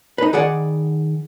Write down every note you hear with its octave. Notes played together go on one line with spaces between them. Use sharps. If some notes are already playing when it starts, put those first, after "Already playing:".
D#4 B4
D#3 G#4 D5 F#5